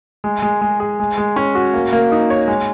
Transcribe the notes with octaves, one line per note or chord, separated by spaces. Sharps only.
G#3
G#3
G#3
G#4
G#3
G#3
C#4
F#4
A#3
A#3
D#4
C#5
G#3